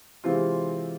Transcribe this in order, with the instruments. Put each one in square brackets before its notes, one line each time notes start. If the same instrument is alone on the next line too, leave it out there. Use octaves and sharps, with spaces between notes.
[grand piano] C3 E3 G#3 C4 F4